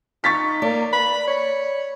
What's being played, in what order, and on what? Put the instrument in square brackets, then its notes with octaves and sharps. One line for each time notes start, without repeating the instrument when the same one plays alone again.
[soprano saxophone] D#4 [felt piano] C#6 A6 B6
[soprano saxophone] A#3 [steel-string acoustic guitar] D5
[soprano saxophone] B5
C#5